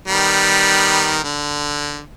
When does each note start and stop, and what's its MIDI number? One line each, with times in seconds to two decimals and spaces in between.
0.08 1.21 51
0.08 1.21 55
0.08 1.21 59
1.23 2.01 50